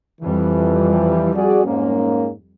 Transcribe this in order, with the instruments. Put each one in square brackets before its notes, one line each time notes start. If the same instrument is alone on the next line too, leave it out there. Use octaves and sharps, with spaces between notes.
[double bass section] F2 G3 [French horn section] E3
[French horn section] F#4 G#4 D5
G#2 A#3 C#4